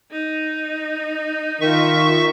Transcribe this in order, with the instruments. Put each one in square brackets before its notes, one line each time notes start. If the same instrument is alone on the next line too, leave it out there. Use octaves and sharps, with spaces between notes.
[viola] D#4
[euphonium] D#3 [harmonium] F4 A#4 [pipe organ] E5 C#6